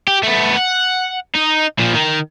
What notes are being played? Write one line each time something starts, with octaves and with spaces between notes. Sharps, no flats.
G4
A3 B3
F#5
D#4
A#2 F3
D#3